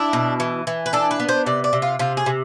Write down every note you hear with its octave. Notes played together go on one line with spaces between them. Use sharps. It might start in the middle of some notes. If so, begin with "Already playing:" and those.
Already playing: D4 E4
B2
E3
E3
B4
D4 A4
B4
B3
C5
C3 D5
D5
C3
F4
C3 F4
G#4
C3